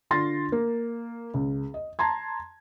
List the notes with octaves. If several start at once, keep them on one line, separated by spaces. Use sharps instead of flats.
D3 F4 C6 A6 A#6
A#3
C#2
D#5
A5 A#5 C6 G#6